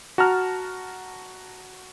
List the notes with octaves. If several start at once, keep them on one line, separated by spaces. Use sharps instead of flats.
F#4 A5 A#5 F6